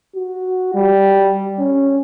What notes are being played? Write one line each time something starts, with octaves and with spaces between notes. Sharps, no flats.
F#4
G3
C#4